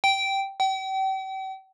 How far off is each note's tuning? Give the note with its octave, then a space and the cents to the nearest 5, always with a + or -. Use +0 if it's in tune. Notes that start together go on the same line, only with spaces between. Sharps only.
G5 -10
G5 -40